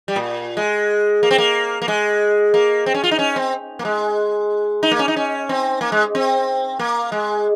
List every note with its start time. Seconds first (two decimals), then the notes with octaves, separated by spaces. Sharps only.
0.08 G3
0.16 A#2
0.57 G#3
1.23 A#3
1.31 C4
1.38 A#3
1.82 A#3
1.88 G#3
2.54 A#3
2.86 C4
2.94 C#4
3.04 F4
3.11 D#4
3.19 C#4
3.36 C4
3.79 A#3
3.85 G#3
4.83 D#4
4.91 A#3
4.99 C#4
5.08 D#4
5.16 C#4
5.49 C4
5.81 A#3
5.92 G#3
6.15 C4
6.79 A#3
7.12 G#3